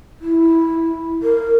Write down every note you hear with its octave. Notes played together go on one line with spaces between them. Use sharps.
E4
A#4